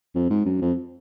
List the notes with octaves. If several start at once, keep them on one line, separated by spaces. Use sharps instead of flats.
F2
G#2
F#2
F2